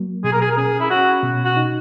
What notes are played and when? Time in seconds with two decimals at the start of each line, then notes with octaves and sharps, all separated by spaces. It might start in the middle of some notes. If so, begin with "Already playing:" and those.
Already playing: F#3 A#3
0.24 B2 G#4
0.33 A#4
0.42 G#4
0.52 A#4
0.57 C#4 G#4
0.80 E4
0.90 C#4 F#4
1.23 B2
1.45 F#4
1.57 D#4